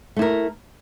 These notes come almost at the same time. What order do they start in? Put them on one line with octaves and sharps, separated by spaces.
A3 E4 A#4